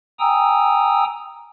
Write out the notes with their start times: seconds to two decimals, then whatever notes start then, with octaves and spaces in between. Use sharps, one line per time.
0.19 G5 G#5 A#5 D#6 E6